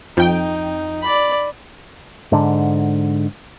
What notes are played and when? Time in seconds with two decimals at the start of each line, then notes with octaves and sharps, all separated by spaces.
0.17 F2 D#4 G5
1.02 D5 B5
2.32 G#2 D3